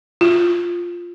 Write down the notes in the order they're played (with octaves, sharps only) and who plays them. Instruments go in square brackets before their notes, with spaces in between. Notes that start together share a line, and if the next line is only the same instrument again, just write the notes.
[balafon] F4